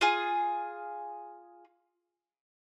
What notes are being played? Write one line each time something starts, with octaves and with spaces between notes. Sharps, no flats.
F4 G#4